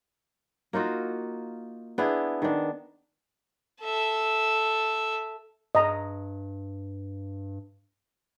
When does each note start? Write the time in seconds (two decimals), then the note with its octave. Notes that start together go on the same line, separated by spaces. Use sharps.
0.73 A#3 D#4 F4 F#4
1.98 B3 D4 E4 G#4
2.42 D#3 D4
3.82 A4 E5
5.75 G2 D#5 A#5